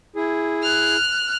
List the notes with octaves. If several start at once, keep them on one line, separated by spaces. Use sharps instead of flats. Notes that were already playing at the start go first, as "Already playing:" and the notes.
E4 G#4
F6 F#6